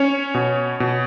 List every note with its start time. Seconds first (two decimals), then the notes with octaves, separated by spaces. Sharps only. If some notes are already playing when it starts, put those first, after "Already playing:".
Already playing: C#4 C#5
0.34 B2
0.80 B2